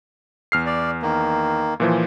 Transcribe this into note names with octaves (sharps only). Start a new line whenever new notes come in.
E2 F6 C7
D5
D#3 A#3
A#2 E3 F3